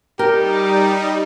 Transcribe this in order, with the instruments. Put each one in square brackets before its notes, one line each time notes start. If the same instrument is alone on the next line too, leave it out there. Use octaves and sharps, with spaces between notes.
[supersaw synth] G3 D#4 [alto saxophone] G4 [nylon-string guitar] A#4